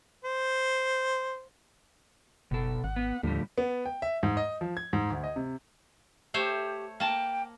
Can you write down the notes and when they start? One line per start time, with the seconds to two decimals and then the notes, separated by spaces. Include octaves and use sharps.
0.25 C5
2.51 F#1 B2 A4
2.84 G#1 F#5
2.96 B3
3.23 D#2 A2 D3 F3 G3 A3
3.58 B3
3.86 G5
4.02 E5
4.23 G#2
4.37 D#5
4.61 F3
4.77 G#6
4.93 G#2
5.10 D2
5.24 D#5
5.36 C3
6.34 A3 G4 C5 C#5
7.00 A#3 G5 A5